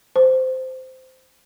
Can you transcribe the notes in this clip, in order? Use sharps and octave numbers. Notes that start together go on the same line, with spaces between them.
C5